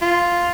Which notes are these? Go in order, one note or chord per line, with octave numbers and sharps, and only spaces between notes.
F4